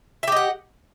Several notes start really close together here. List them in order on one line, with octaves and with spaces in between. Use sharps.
E5 G4 D#5 F#5